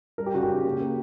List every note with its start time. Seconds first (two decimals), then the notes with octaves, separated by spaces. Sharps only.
0.18 G3 A#4
0.26 G4
0.34 C#3 F#4
0.42 G4
0.49 C#3
0.64 A#3
0.80 A#3